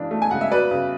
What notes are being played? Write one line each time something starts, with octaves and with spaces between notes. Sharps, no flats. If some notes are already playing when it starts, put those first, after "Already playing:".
Already playing: C#3 E3 D4
A3
G#5
C#3 F#5
E5
F#3 B4 D5
C#3